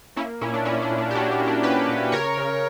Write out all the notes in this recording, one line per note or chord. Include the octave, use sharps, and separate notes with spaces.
A#3 C#4 E4
A#2 C#4 E4
D4
A#2 C#4 E4
D4
A#2
D4
G4
A#2 D4 F#4
D4
A#3
D4
A#3 G4 B4
A#2
C#3 A#4 C#5
C#3